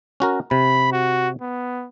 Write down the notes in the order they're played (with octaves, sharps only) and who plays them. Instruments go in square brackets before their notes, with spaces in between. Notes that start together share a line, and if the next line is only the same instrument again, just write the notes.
[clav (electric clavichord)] C#4 F#4 A#4
[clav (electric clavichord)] C3 [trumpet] B5
[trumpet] F#4
B3